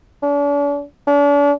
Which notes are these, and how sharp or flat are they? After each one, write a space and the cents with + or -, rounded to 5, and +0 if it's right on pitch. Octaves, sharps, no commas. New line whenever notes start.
D4 -45
D4 -40